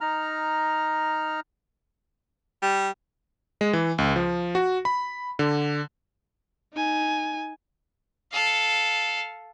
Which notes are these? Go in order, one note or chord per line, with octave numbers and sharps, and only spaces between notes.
D#4 A#5 F6
G3
G#3
E3
C#2
F3
F#4
B5
D3
D#4 G#5
A4 F5